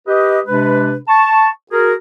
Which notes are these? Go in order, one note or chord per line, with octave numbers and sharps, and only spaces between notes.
G4 B4 D#5
C3 G#3 D4 B4
A5 C#6
F#4 G#4 A#4